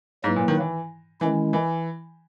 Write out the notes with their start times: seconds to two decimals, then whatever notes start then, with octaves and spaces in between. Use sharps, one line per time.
0.24 G#2 F#3 A#3 E4 B4
0.36 A#2
0.48 D#3
0.60 E3
1.21 D#3 E3 G#3 C#4 E4
1.53 E3